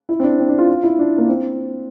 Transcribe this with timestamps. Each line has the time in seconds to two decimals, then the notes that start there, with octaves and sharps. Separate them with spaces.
0.09 E4
0.20 C4
0.23 D4
0.39 C4
0.48 D4
0.58 F4
0.69 F4
0.83 E4
0.99 D4
1.18 A#3
1.28 C4